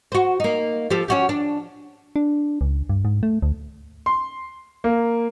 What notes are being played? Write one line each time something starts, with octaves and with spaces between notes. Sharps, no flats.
F#4 C5
A#3 D#4
F3 G4 A4
C#4 F#4 G4
D4
D4
C#2
G2
G#2
A3
D2
C6
A#3